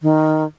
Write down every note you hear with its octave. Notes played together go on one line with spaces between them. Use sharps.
D#3